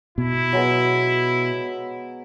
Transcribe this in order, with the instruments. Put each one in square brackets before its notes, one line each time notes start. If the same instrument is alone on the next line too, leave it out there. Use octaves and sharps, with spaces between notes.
[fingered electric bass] B2 [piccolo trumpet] E4
[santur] F#3 G#3 B3